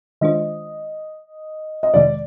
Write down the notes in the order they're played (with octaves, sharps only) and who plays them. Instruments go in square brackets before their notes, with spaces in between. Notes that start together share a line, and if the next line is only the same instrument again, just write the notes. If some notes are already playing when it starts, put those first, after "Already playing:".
[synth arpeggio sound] D#3 G#3 D4 F4 C5 [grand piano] D#5
[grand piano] D#5
[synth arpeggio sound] F2 C3 D#3 G#3 [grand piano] D5